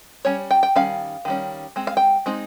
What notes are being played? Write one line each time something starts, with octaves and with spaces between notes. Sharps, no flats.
G3 C#4 C#5
G5
G5
D#3 G3 C#4 F5
D#3 G3 C#4
G#3 C4
F5
G5
G#3 C4 D#4